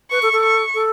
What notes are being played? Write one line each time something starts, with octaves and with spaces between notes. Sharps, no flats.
B4 C#6
A4
A4
C#6
A4